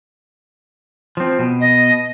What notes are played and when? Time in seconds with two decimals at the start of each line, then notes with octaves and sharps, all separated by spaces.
1.17 F3 C4
1.39 B2
1.61 D#5